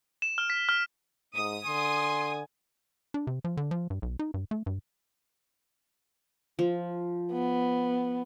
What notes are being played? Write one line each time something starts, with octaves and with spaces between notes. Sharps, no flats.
E7
F6
B6
F6
G#2 D#6
D3 G#5 C6
D4
C3
F3
D3
F3
G2
B1
D#4
G2
A3
G2
F3
B3